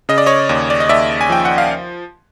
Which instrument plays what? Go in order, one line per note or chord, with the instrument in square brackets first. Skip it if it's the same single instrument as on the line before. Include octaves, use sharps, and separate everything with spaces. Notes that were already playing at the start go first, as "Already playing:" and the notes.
[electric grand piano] C#3 D#5
D5
C#5 D#5
D#2
D5
D#5
D#2 D5 E5
G#5
F3 G5
F#5
F5